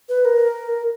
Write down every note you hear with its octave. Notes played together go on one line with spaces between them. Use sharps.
B4
A#4